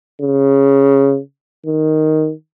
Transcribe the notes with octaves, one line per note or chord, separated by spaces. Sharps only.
C#3
D#3